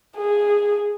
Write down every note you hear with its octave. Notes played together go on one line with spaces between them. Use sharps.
G#4